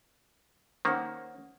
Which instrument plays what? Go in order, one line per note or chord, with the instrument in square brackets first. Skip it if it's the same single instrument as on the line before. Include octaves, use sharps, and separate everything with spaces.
[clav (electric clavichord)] D#3 A#3 [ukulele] C#4 C5 F#5